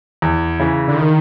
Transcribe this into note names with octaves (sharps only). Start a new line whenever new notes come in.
E2
C#3 E3
D3
D#3